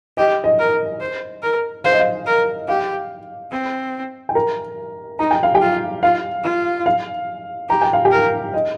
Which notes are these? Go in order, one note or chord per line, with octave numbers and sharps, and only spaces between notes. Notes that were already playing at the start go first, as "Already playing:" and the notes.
G4 D#5
D#5
A#4
C5
A#4
C5 F5
D#5
F5
A#4
G4 F5
C4
G5
A#4 A#5
D#4 A#5
G5
F5
G4 G5
F4
F4 F5
F4
F5
G4 A#5
G5
F5
G4 G5
A#4
D#5